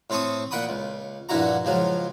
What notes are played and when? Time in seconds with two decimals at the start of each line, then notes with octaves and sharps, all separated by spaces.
0.10 A2 C4 A4 C#6 D#6
0.51 A#2 F#5 G5 B5 D#6
0.69 C#2
1.29 A#1 G2 D3 E4 F#4 A#5
1.65 C#2 F3 F#3